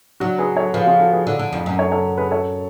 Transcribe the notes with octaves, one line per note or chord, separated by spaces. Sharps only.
F#3 D4 F#4
G#4 B4
A4 C#5
F3 G#4 B4
F4 G#4
F#4 A4
G#4 B4
D3
D3
F2
F#2
A4 C#5
A4 C#5
G#4 B4
A4 C#5